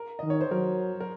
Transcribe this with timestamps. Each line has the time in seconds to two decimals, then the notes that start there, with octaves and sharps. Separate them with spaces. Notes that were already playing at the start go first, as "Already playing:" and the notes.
Already playing: A#4
0.19 D#3 D#5
0.30 C#5
0.41 C5
0.51 F#3 A#4
1.00 A#4